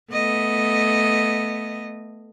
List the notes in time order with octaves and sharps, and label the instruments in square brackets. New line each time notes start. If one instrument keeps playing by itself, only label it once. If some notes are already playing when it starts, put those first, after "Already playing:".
[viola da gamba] A3 B3 D#5